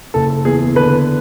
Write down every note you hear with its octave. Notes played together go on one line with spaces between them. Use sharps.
F#1 A4
E2 G#4
D3 B4